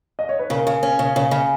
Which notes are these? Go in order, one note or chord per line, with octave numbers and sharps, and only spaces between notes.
D#5
C#5
B4
C#3 A#4
C#3
C#4
C#3
C#3
C#3